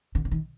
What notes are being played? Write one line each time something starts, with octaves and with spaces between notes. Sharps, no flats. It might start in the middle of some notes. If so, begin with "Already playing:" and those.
D3
D3
D#3